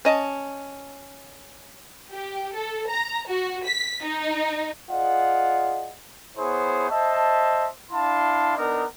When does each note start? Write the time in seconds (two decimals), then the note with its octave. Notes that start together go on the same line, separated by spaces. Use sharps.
0.05 C#4 D#5 A5
2.11 G4
2.55 A4
2.89 A#5
3.29 F#4
3.66 B6
4.04 D#4
4.91 F4 G#4 D5 D#5 F#5
6.37 B3 E4 G#4 C5 C#5
6.90 C5 D#5 E5 A5
7.91 D4 E4 F5 A5 C6
8.57 B3 D4 D#4 A#4